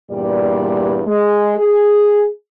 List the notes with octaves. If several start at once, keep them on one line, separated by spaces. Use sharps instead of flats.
E2 G2 A#2 G3 D5
G#3
G#4